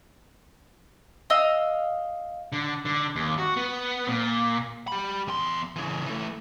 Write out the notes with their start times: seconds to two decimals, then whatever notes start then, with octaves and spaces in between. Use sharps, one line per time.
1.30 D#5 F5 E6
2.52 D3
2.85 D3
3.16 D#2
3.38 F#4
3.57 B3
4.08 A#2
4.88 G4 B5
5.28 E2 C6
5.76 C#3 E3
6.06 E3 A3